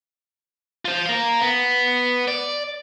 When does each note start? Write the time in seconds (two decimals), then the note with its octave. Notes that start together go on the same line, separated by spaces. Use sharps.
0.85 F4 C5
1.06 A#4 F5
1.42 B3
2.28 D5